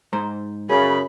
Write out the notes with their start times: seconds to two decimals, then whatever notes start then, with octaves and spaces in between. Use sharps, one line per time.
0.13 G#2 C5 A#5
0.69 F#2 C#3 G#4 B5